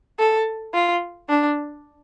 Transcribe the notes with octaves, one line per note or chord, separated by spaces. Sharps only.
A4
F4
D4